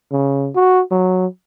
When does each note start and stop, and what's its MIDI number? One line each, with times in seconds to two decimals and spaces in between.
0.12 0.50 49
0.55 0.81 66
0.92 1.26 54